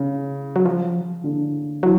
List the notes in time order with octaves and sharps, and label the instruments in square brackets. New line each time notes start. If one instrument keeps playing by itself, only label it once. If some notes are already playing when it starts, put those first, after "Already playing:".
Already playing: [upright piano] C#3
[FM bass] F#3
F3
[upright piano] D3
[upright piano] E3 [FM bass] F#3